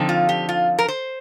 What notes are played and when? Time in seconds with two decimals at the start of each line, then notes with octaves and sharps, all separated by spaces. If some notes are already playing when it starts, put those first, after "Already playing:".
Already playing: D3 F3 C4 D#4
0.09 F4
0.29 G4
0.49 F4
0.78 A#4
0.88 C5